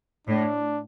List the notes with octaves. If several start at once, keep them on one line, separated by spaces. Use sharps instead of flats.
A2 D4